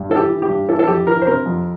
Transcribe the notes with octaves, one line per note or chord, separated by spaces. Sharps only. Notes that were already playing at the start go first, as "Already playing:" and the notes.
Already playing: G2
E3 A4
G4
E3
G4
G2
E3 A4
A4
F2 G4
E3 A#4
C5
C3 A#4
F2